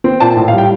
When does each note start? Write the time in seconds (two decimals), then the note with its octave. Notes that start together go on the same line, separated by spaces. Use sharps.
0.04 C4
0.20 A#2 A5
0.37 A2
0.48 F5
0.53 G3 G5